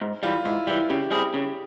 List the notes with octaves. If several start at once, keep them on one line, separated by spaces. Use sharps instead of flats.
G#2
E3 G3 F4
G#2 E4
E3 G3 E4
C#3 G4
G3 C4 E4 G#4
C#3